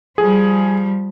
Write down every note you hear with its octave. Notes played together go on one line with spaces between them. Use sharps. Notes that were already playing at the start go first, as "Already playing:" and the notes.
F3 G3 G#4